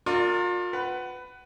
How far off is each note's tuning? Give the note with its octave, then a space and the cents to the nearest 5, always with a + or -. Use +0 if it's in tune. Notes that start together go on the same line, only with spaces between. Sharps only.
F4 +35 A#4 -25 D5 +0
B4 +15 F#5 +25